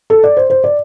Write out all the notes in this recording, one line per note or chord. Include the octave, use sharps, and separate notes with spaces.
A4
D5
C5
C5
D5